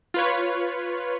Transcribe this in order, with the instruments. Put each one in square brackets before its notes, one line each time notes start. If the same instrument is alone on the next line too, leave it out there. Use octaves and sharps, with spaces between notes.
[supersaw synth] F4 B4 C#5